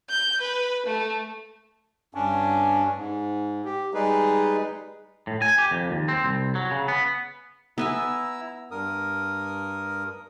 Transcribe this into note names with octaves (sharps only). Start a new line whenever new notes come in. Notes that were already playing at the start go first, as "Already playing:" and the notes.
G6
B4
A3
G2 C#4 D4
G#2
G4
G3 G#3 D#4 G#4 B4
A2
G#5
G4
F2
D#2
C4
C2
F#3
C#3
B3
B3 E4 E5 G#5 A#5 E6
G2 A#4 D#6